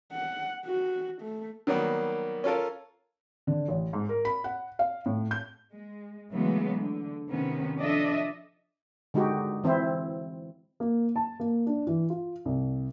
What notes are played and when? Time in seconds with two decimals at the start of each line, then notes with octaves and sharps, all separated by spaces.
0.13 F#5
0.66 F#4
1.22 A3
1.67 D#3 F#3 G3 A#3 B3
2.44 C#4 F4 A4 A#4
3.47 D3
3.68 A1
3.93 G#2
4.09 A#4
4.25 B5
4.44 F#5
4.79 F5
5.06 A2
5.31 G6
5.72 G#3
6.31 C#3 E3 F#3 G#3 A3 B3
6.77 D3
7.30 C3 D#3 B3 C#4
7.79 F3 D4 A4 D#5 E5
9.14 D3 G#3 D#4 F#4 G4
9.64 E3 C4 E4 C5
10.80 A#3
11.16 A5
11.40 A#3
11.67 D4
11.87 E3
12.10 F4
12.45 C2